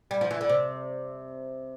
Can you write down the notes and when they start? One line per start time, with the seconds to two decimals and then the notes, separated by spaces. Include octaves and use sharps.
0.11 G3
0.21 F3
0.31 E3
0.41 D3
0.49 C3